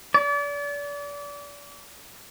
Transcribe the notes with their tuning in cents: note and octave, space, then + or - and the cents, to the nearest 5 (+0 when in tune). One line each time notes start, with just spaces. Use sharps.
D5 -35